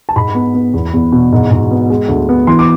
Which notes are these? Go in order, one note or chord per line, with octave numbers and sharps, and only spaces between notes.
A5
G#2 B5
B3
B3
E2
E2
B2
G#2
G#2
B3
G#3
D2
B3
E3 C6
D6